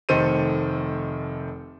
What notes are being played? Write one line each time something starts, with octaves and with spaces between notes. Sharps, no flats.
F1 D#3 A3 A4 C5 D#7